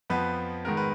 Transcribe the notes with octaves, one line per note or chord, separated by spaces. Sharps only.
F2 F3 B3 B4
G#2 D#3 G#3 B3 A#4
B4